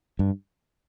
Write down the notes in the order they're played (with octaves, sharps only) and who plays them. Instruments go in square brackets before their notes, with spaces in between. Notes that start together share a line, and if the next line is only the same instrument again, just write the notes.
[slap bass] G2